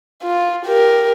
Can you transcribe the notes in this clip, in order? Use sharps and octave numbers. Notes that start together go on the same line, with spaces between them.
F4
G4 A#4